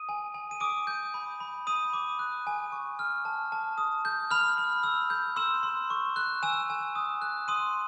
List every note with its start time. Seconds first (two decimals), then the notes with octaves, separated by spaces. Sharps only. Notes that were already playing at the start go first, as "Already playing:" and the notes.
Already playing: D#6 D#7
0.09 G#5
0.34 G#5
0.51 D#7
0.60 D6 D#6 D7
0.87 G6
1.14 B5
1.40 B5
1.67 B5 D#6 D#7
1.93 D6
2.19 F#6
2.47 G#5
2.72 C#6
2.99 F6
3.25 A5
3.52 A5
3.78 D#6
4.05 G6
4.31 B5 F6 F7
4.58 B5
4.83 E6
5.10 G6
5.36 C6 E6 E7
5.63 C6
5.90 C#6
6.16 F#6
6.43 G#5 E6 E7
6.70 G#5
6.95 D#6
7.22 F#6
7.48 C6 D#6 D#7